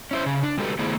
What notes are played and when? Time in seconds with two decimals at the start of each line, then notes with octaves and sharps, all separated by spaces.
0.11 C#4 E4 C5
0.26 C#3 C#4
0.43 D4
0.57 G3 G#3 F#4 G4 A4 B4
0.79 D#3 A3 B3 E4 G#4 C5